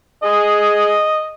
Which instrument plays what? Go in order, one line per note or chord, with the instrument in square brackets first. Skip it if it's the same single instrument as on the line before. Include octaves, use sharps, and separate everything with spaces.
[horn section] G#4 [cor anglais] D#5